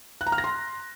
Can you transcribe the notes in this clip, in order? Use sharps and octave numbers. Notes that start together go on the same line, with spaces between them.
F#6
A#5
F6
A#6
C6